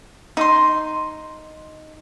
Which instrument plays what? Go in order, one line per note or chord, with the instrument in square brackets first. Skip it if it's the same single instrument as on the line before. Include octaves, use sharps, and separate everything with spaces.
[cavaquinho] D#4 C6